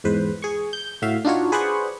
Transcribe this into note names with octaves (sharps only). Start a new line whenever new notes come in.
E2 G#2 B4 C5
G#4 C#6
G6
A2 F#4 E5 F5
D4 D#4 F4 F#4 C#5
G#4 B4 C5 D5 F#5 C#6